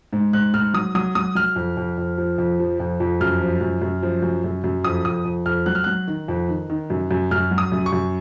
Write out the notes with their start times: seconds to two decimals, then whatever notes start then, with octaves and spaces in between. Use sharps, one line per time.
0.13 G#2
0.33 G#2 F#6
0.54 G#2 F6
0.74 F#3 D#6
0.95 F#3 D#6
1.15 F#3 D#6
1.35 F#3 F6
1.56 F2
1.77 F2
1.98 F2
2.18 F3
2.38 F2
2.59 F3
2.80 F2
3.00 F2
3.21 F#2 F6
3.41 F3
3.61 F#2
3.82 F#2
4.03 F3
4.22 F#2
4.44 F#2
4.64 F#2
4.84 F2 D#6
5.05 F2 D#6
5.25 F2
5.46 F2 F6
5.66 F#3 F#6
5.75 F6
5.84 F#3 F#6
6.08 D#3
6.28 F2
6.49 D#3
6.70 D#3
6.90 F#2
7.11 F#2
7.31 F#2 F6
7.51 F#3
7.58 D#6
7.72 F#2
7.86 C#6
7.92 F#2